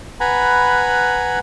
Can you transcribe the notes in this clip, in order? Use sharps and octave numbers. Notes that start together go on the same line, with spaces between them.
B4 F#5 G#5 A#5 B5